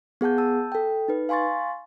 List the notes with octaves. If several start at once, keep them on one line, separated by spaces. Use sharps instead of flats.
B3 G#4 F#5 A5 G6
A5 E6 G6
A4 G5
D#4 B4
F5 G#5 C6 C#6 A6